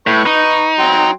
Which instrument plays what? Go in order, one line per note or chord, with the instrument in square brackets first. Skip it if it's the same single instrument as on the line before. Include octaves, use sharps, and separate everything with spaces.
[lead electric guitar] A2 [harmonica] B4 C#6
[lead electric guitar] D#4
[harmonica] F#3 G5 C6